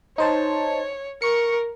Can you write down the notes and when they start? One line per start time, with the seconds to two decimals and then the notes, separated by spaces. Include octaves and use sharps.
0.18 D#4 C5 C#5 A5
1.22 A#4 C#6 C#7